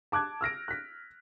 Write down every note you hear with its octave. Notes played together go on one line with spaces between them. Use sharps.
A5 D6 F#6 G#6
E6 F6 A#6 D7
F#6 B6